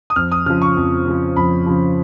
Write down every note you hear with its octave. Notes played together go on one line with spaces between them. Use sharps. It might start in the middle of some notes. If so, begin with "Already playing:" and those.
D#6
F2 F6
D#6
C#3 F3 F6
C#6
F2
C#3 F3
F2 B5
C#3 F3